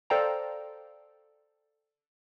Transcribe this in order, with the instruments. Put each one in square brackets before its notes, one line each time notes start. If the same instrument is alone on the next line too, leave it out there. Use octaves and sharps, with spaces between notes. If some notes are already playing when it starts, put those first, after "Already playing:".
[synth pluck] A4 C5 D5 F5 G5 A#5